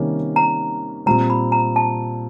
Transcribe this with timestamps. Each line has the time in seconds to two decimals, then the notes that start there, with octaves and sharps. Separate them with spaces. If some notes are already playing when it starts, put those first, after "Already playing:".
Already playing: C3 D#3 G3 A#3 C#4
0.36 A#5
1.06 A#2 G3 C4 A#5
1.30 B5
1.52 A#5
1.76 A5